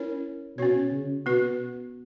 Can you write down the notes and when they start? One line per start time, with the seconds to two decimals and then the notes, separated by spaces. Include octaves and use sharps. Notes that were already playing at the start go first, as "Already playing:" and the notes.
Already playing: C#4 E4 A#4 C#5
0.58 B2 C#4 F#4 C#5
0.92 C#3
1.26 B2 B3 F#4 B4